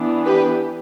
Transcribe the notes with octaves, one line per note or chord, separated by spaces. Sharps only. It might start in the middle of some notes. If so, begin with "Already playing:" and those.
Already playing: E3 B3 D4
G4 B4